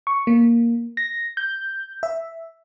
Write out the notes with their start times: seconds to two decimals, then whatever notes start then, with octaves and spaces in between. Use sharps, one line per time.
0.07 C#6
0.27 A#3
0.97 A#6
1.37 G6
2.03 E5